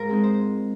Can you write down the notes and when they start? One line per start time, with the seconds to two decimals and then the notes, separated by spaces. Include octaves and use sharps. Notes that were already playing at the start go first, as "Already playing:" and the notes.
Already playing: G#2 F4 A#4
0.09 G#3 C4 D#4
0.23 C5